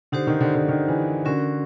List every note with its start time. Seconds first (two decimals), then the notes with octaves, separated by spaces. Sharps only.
0.12 D3 D#4 G4 C5
0.27 D#3
0.41 D3
0.55 D3
0.68 D#3
0.88 E3
1.25 D3 C#4 F#4 A#4